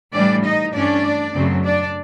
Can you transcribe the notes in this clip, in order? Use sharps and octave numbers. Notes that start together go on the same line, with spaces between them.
A2 E3 G3 D4 D5
D#4 D#5
G2 E3 A3 C#4 D4 D5
F#2 C#3 F#3 A3 C4
D4 D5